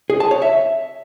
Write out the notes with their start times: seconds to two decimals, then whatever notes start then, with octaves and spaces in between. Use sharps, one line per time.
0.10 G#4
0.20 A5
0.31 C#5
0.42 E5